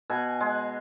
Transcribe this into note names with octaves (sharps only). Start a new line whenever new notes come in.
B2 G#5
G#3